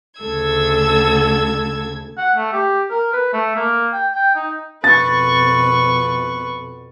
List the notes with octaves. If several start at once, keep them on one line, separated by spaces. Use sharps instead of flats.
D2 C#3 A4 E6 G#6
F#5
A3
G4
A#4
B4
A3
A#3
G5
G5
D#4
F2 B2 B4 C#6 A6